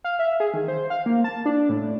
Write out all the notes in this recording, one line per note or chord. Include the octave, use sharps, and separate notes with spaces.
F5
E5
G#4
D#3
C5
F5
A#3
A5
D4
A2